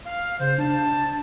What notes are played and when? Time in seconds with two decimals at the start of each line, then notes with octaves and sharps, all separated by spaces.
0.05 F5
0.39 C#3 C5
0.58 D4 A5